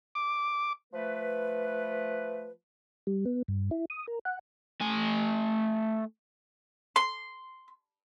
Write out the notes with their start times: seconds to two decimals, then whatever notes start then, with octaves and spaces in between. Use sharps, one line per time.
0.15 D6
0.93 F3 A3 B4
3.07 G3
3.26 B3
3.48 G2
3.71 E4
3.90 D#6
4.08 A#4
4.25 F#5
4.81 A3 G#5
6.96 C6